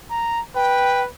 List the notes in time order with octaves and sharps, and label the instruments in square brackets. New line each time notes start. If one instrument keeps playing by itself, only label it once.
[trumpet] A#5
[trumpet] B4 [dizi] G5